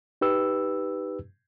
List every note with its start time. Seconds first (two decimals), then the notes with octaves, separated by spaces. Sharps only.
0.21 D#4 G4 B4 E6